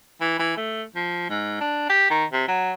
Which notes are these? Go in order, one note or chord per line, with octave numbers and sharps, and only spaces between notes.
E3
E3
A3
F3
G#2
D4
G4
D#3
C3
F#3